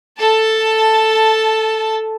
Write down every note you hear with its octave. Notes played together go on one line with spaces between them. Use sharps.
A4 A5